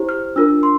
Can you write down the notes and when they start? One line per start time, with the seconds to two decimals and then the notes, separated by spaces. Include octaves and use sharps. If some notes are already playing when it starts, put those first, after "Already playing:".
Already playing: E4 G4 C5
0.09 F6
0.36 D4 F4 A#4 E6
0.63 C6